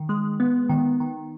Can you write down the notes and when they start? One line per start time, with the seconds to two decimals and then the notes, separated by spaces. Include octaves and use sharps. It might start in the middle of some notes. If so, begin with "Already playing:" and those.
Already playing: D#3
0.09 G#3
0.40 B3
0.69 D#3
1.00 D#3